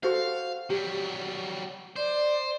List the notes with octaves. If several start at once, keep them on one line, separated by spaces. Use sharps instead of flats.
F#4 A4 C5 F5
F#3 G3 G4
C5 D5